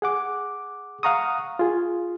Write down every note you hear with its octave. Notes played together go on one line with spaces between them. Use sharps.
G#4 F#5 D6
F5 F#5 A#5 C#6 D#6
F4 G#4